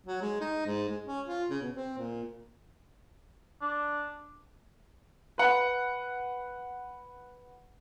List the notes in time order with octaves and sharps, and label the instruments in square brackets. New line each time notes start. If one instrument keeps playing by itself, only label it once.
[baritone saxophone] F#3
G#3
D#4
G#2
G#3
C#4
F4
C#3
B2
C4
A#2
[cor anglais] D4
[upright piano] B4 F#5